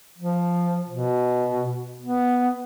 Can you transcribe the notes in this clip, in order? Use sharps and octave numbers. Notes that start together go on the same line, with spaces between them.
F3
B2
B3